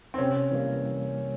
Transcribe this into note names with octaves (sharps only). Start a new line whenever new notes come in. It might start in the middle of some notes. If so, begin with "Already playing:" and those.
C4
C3 C#4
E3 G3 A#3